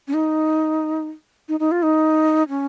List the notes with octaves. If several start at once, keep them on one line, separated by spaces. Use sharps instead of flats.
C#4
D#4
D#4
D#4
F4
D#4
C#4